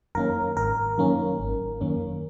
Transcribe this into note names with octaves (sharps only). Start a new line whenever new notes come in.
F#2 D#3 A#3 C#4 A#4
G#1 A#4
F#2 D#3 A#3 C#4
G#1
F#2 D#3 A#3 C#4